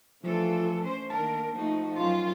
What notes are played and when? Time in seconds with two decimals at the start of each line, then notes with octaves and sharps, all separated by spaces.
0.24 E3 F3 A3 D4 F4 A4
0.81 C#4 C5
1.10 D#3 A#3 D4 A#4 A5
1.55 F3 A3 D#4 F#4
1.96 F#2 F4